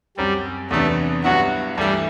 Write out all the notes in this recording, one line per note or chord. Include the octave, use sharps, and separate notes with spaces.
F#2 F#3 G3 C4
E2 C3 F#3 A3 B3 D4
G2 F#3 B3 E4 F#4
G2 E3 G3 A3 E4